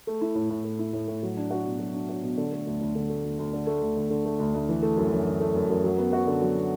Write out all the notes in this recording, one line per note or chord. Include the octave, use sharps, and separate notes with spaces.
A3
E4
A2
A2
A3
E4
A2
A2
F#3
D4
F#4
B2
F#3
D4
F#4
B2
D3
A3
D2
D2
D3
A3
D2
D2
D3
A3
D2
D2
D3
A3
D2
D2
E3
A3
F#2
F#2
E3
A3
F#2
F#2
F#3
B3
F#4
D3
F#3
B3